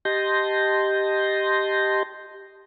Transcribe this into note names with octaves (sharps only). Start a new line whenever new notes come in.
G4 D#5 A5 C6 G6 A#6